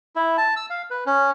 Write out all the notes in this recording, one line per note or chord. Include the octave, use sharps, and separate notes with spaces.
E4
A5
E6
F5
B4
C#4